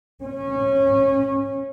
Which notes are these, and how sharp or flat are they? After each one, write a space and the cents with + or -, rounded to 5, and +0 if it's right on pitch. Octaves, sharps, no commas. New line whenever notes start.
C#4 -20